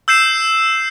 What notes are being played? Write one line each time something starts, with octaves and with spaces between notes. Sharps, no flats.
E6 G6 C7 E7